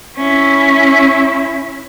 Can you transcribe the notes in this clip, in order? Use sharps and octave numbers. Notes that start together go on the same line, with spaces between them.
C#4 E4